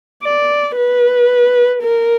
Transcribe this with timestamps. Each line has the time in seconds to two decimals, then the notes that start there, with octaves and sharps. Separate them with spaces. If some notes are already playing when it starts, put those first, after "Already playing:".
0.23 D5
0.76 B4
1.82 A#4